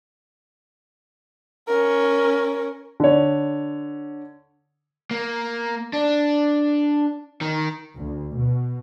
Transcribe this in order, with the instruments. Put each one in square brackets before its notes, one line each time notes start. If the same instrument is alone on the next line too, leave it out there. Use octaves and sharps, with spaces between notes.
[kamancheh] C#4 A#4
[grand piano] D3 C#5
[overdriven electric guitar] A#3
D4
D#3
[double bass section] D2
B2